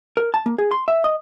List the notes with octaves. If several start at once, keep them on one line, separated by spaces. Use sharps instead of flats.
A#4
A5
A#3
G#4
C6
E5
D#5